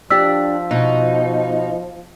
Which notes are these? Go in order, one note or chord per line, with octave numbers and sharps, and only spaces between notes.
F3 D4 G4 E6 B6
B2 D#4